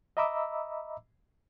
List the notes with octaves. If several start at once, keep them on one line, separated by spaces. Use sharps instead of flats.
D#5 E5 A#5 B5 D6 E6